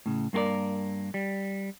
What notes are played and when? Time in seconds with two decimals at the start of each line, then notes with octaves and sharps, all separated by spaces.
0.06 A2 C#3
0.33 G2 A#3 F#4 A#4 D5
1.14 G3